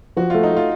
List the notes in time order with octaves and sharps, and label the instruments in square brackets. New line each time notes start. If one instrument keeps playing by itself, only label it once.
[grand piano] F3 [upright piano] F#4
[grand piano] A3 [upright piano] F4
[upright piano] D#4
[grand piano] A3 [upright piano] F4